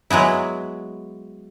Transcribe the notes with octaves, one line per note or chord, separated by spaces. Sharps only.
F#3 G#3 B3 E4